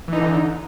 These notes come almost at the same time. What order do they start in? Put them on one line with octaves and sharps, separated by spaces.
E3 D#4 D3